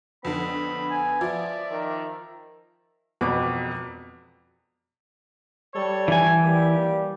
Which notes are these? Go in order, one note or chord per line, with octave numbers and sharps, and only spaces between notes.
F2 D3 B3 B5
G#5
F3 D5 E5
D#3
E1 F2 B2 F#4 B4 D6
G3 A4 C#5
E3 G#5
G3 A#3 G4